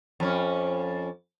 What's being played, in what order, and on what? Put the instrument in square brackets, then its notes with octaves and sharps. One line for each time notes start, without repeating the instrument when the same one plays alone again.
[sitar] F2 C#4